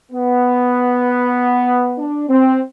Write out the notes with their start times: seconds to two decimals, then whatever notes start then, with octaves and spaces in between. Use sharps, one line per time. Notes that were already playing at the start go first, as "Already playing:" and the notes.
0.12 B3
1.98 D4
2.29 C4